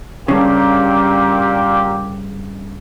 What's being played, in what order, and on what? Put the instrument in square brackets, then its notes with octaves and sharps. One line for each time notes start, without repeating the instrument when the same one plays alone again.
[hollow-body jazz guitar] G2 C#3 [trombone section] A#2 A#3 G4